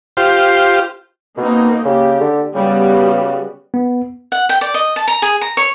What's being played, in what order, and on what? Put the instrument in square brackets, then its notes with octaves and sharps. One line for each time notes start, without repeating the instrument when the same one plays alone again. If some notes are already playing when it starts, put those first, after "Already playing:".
[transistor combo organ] F4 G4 C5
[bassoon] B2 [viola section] A#3 C4 D#4
[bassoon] C#3 [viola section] G4
[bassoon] D3
[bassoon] C#3 [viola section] G3 B3 F#4
[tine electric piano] B3
[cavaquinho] F#5
G5
D5
D#5
A5
A#5
G#4
A#5
C#5